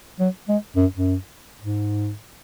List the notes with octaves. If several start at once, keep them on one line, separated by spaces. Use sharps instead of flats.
F#3
G#3
F#2
F#2
G#2